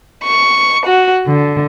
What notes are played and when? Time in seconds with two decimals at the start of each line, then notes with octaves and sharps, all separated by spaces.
0.23 C#6
0.86 F#4
1.27 D3